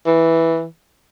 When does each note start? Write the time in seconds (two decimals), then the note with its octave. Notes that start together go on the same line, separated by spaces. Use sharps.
0.06 E3